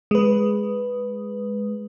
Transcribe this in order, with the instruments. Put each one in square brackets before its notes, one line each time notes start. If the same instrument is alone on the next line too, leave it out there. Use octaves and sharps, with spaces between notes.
[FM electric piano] G#3 B4